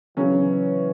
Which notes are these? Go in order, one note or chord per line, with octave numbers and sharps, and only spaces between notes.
C#3 E3 F#3 C#4